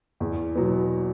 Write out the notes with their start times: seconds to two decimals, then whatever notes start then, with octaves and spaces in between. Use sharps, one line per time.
0.20 E2
0.56 B2 F#3 B3